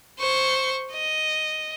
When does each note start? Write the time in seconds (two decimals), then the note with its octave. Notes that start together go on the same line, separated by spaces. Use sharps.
0.19 C5 C#6
0.92 D#5